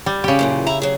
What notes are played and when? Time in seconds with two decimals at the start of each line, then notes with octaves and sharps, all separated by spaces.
0.06 G3
0.24 C#3 G4
0.39 F#2 A#2 E3
0.66 E4 E5 A#5
0.82 F#3 G#4